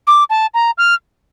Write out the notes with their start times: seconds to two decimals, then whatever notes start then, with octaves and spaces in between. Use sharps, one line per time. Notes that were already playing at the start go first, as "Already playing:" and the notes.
0.07 D6
0.30 A5
0.54 A#5
0.78 F6